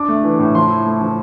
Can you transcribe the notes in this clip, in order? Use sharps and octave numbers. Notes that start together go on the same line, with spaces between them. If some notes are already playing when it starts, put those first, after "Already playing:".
Already playing: D4 D6
A3
E3
A2
F3 C6
E4
A3
F3